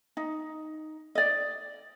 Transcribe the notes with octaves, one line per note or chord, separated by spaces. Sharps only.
D#4
D5 D#5